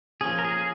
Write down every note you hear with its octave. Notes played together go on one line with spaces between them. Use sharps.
F3 A#3 C#4 G#4
A#4
G#4